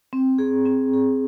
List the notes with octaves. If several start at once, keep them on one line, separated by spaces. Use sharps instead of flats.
C4
G#4
C4
G#4